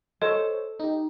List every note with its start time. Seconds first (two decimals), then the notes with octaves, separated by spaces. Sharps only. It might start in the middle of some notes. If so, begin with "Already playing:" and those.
0.22 A4 C5 C#5 D#5
0.80 D#4 G4